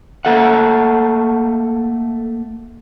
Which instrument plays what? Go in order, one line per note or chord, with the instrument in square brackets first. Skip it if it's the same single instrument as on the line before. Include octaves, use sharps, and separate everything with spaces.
[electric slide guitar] A3 A#3 A4 E5 F#5